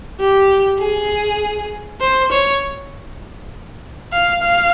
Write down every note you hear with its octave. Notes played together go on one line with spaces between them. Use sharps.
G4
G#4
C5
C#5
F5
F5